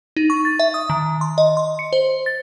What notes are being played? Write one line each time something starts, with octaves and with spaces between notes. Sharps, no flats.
D#4
C#6
A6
E5
D#6
D#3
C6
D#5
C6
C#7
C5
A6